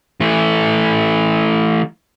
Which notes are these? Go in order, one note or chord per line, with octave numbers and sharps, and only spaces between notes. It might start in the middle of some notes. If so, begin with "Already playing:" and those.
E3 A3